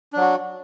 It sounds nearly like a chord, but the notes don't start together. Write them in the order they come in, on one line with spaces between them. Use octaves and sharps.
D4 F#3 F#4